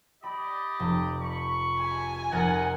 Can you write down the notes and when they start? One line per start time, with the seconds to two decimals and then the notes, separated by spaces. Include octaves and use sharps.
0.23 G4 D5 D#5 B5
0.80 F1
1.22 B5 C#6
1.80 G#5
2.32 F1 A#4 D#5 F#5 A6